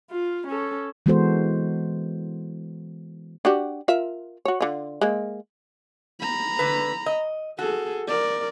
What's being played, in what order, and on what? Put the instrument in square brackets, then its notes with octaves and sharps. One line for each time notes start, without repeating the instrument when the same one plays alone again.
[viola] F4
C#4 A4
[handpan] E3 G#3 B3 F#4 A4 C5
[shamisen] D4 F#4 G4
F4 A#4 E5
F#4 C#5
D3 F4
G#3 A#3
[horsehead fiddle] A#5 B5
[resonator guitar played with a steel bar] D3 B4
D#5
[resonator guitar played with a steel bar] F#4 [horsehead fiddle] G#4 A4
[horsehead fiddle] A#4 D5